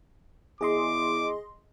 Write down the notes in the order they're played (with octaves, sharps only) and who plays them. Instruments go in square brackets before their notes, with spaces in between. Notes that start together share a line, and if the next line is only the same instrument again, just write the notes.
[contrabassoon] E2 [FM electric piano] G#4 D#5 C6 [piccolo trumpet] D6